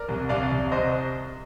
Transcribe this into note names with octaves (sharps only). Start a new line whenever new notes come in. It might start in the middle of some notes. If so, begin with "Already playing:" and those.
Already playing: A#4 D5
C2
C2 D5 F5
C2
C2 C5 D#5